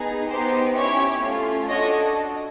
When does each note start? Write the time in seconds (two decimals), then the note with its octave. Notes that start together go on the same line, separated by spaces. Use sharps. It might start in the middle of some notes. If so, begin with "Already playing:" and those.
Already playing: B3 D#4 G#4
0.29 B3 D#4 G4 C5
0.75 C#4 E4 G4 C#5
1.21 A3 C#4 F4
1.69 D4 F#4 A4 C#5 D#5